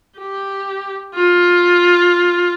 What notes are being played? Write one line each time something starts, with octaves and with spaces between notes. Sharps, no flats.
G4
F4